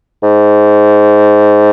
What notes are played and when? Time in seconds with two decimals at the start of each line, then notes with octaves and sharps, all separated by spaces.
0.23 G#2